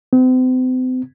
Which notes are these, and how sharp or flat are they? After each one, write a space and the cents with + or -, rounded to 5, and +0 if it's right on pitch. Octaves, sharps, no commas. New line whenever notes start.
C4 -40